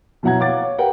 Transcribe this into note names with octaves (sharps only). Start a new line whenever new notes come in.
B2 F#3 E4 F#5 A#5 G#6
C#5 F5 F#5 D6 A6
C#5
G4 A#4 B4 F#5 G5